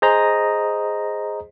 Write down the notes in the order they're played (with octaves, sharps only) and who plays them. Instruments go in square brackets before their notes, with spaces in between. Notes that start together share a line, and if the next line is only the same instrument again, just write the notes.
[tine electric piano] G#4 C5 D#5 A#5